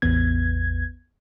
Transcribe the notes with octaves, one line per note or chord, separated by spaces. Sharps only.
A1 E2 B3 G#6